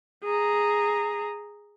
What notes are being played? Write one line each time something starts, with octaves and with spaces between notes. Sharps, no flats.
G#4 A#5